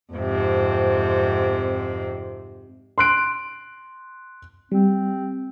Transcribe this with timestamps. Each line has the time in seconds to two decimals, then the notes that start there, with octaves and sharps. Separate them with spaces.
0.14 F2 G#2 C3
2.98 C6 F#6 D7
4.72 G3 C4